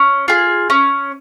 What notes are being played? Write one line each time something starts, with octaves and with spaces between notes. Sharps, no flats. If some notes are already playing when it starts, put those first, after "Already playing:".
Already playing: C#4
F4 G#4
C#4